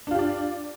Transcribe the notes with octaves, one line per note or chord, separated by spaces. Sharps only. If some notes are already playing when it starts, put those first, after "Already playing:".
D4 F4 G4 D5